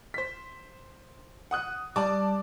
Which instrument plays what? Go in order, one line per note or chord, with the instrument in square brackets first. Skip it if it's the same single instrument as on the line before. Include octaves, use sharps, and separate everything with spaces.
[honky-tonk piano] C5 B6
F#5 D#6 F#6
[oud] G3 [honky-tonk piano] D5 A5 D6